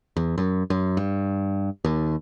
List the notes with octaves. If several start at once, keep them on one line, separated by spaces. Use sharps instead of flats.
E2
F#2
F#2
G2
D#2